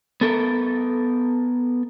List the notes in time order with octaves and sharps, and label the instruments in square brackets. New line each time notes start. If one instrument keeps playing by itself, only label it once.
[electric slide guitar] B3 A4 A#4